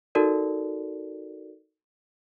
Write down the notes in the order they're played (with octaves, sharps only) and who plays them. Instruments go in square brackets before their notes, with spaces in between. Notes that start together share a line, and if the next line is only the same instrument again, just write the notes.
[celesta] D#4 F#4 A4 A#4 D5